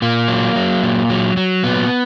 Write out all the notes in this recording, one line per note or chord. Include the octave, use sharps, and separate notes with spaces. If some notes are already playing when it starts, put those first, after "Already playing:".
A#2 A#3
F#3
F#3
A#2
F#3
F#3
A#2 B3